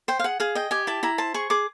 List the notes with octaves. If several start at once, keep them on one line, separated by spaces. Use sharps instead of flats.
C5 G5
F5
G#4 F#5
G#4 F5
D#5 G5
G4 G#5
E4 A5
E4 A#5
C5 A5
G#4 C#6
G#4 D6